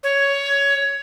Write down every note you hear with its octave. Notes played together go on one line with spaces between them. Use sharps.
C#5